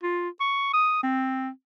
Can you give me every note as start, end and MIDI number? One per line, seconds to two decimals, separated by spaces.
0.03 0.29 65
0.40 0.72 85
0.73 0.99 87
1.03 1.49 60